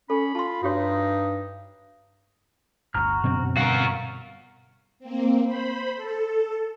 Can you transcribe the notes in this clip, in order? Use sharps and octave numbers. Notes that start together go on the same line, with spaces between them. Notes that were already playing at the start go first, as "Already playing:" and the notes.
C#4 A4 B5
F4 A5 C6
G2 D#4 F#4 G4 C#5
G1 D2 F#4 A#5 F6
F#2 B2 D3 F#3 C4
G2 F#4 A#4 F5
A#3 C4
C5 B5
A4